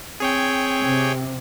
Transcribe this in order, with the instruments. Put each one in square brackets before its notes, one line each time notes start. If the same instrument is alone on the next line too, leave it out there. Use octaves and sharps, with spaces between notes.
[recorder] C4 [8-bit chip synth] G#4 C#5 G5
[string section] C3